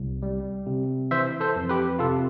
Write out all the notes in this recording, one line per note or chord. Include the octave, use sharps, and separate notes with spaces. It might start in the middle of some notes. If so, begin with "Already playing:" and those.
Already playing: C2
G3
C3
E3 C5 E5
A4 C5
F2
G4 B4
C3 F4 A4